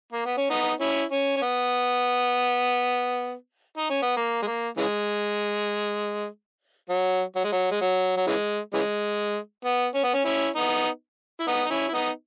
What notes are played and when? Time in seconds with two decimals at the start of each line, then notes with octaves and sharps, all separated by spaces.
0.12 A#3
0.25 B3
0.37 C#4
0.50 B3 D#4
0.80 C#4 E4
1.12 C#4
1.37 C#4
1.42 B3
3.77 D#4
3.90 C#4
4.02 B3
4.16 A#3
4.42 G#3
4.47 A#3
4.77 C#3 E3 G#3
6.90 F#3
7.36 F#3
7.44 G#3
7.52 F#3
7.71 G#3
7.81 F#3
8.17 F#3
8.27 C#3 E3 G#3
8.74 C#3 E3 G#3
9.65 B3
9.95 C#4
10.04 B3
10.14 C#4
10.25 C#4 E4
10.56 B3 D#4
11.40 E4
11.47 B3 D#4
11.65 D#4
11.70 C#4 E4
11.88 E4
11.93 B3 D#4